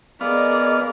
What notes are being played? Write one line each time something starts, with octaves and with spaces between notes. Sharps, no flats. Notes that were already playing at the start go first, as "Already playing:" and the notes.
B3 G#4 A#4 D5 D#5 F5